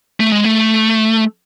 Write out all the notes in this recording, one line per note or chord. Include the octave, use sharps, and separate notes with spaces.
A3
G#3
A3